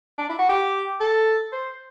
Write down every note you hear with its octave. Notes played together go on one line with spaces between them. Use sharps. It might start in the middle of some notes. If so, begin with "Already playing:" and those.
D4
E4
F#4
G4
A4
C5